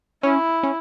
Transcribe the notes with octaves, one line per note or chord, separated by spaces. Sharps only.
C#4 E4
C#4